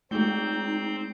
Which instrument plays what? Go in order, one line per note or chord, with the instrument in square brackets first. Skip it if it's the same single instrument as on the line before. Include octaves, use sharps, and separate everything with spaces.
[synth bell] G#3 A3 G#4 [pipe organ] C4 G6 [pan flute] D#4